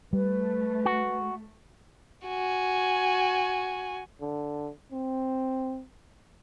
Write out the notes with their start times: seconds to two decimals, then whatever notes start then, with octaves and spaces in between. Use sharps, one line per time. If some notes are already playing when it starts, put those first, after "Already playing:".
0.13 G3 A3 B4
0.85 F#4
2.27 F#4 G#5
4.21 D3
4.92 C4